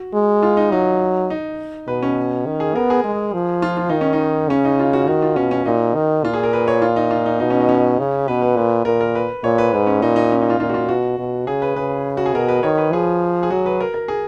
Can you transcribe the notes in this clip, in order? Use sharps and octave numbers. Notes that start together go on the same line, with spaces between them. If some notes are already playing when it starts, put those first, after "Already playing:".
Already playing: F#4
G#3
F4
D#4
F#3 D#4
D#4
B2 B4
C#4
D#3
G#4
B3 A#4
G#4
G#3
F3
F4
F4
D#3 D#4
C#4
D#4
C#3 C#4
D#4
F4
F#4
D#3 F#4
F4
B2 C#4
C#4
A#2 D#4
D#3
A#2 F4
G#4
A#4
B4
C#5
F4
D#4
F4
D#4
B2 D#4
C#4
D#4
C#4
C#3
B2 B4
B4
A#2 B4
A#2 A#4
A#4
B4
A#2 C#5
B4
G#2 B4
C#4
A#2 D#4
D#4
C#4
D#4
F4
A#2 F4
F#4
F4
B2 F#4
B2
C#3 G#4
B4
C#3 B4
F#4
G#4
B2 A#4
B4
D#3 C#5
B4
F3 G#4
G#4
F#3 F#4
B4
A#4
A#4
G#4